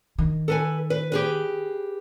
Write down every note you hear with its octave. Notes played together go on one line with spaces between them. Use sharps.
D#3
A4 B4 G#5
B4
G4 G#4 B4